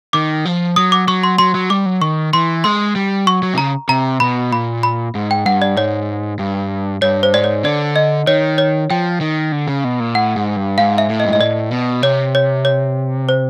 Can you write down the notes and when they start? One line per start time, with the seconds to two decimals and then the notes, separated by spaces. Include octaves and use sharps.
0.13 D#3 D6
0.45 F3
0.76 F#3 D#6
0.92 D6
1.08 F#3 C#6
1.23 C6
1.38 F#3 C6
1.55 F#3
1.70 G3 D6
1.86 F#3
2.01 D#3 C#6
2.33 E3 C6
2.64 G#3 C6
2.96 G3
3.26 F#3 C#6
3.43 F#3
3.54 C3
3.58 C#3 A#5
3.89 C3 A#5
4.20 B2 B5
4.51 A#2 B5
4.83 B5
5.15 G#2
5.31 G5
5.46 G2 F#5
5.62 D5
5.76 G#2 C#5
6.39 G2
7.02 G2 C#5
7.23 C5
7.34 G#2 D5
7.44 C#5
7.64 D3 D5
7.96 D#5
8.27 D#3 C#5
8.58 C#5
8.90 F3 G5
9.21 D#3
9.52 D3
9.68 C#3
9.84 B2
10.00 A#2
10.15 A2 F#5
10.36 G#2
10.56 G2
10.78 G#2 F5
10.98 E5
11.10 A2
11.20 D#5
11.25 G2
11.32 G#2 D#5
11.40 A2 D5
11.71 B2
12.02 C3 C#5
12.35 C#5
12.65 C#5
13.29 C5